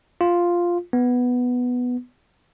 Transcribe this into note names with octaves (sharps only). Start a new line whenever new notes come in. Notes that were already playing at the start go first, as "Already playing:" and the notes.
F4
B3